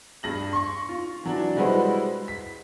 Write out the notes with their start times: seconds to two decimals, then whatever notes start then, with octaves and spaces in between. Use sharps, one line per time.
0.23 G2 A#6 F#7
0.53 C6 C#6
0.89 F4
1.24 E3 F#3 D4
1.56 G3 G#3 E4 F#4 B4 C5
2.28 B6